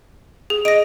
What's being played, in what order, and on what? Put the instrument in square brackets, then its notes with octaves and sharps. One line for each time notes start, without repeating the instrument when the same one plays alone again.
[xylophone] G#4
[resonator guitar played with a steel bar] D#5 [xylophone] A#6 D7